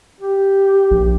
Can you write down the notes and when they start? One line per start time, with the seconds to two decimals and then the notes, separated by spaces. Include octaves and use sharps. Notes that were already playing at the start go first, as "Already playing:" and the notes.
0.20 G4
0.91 A#1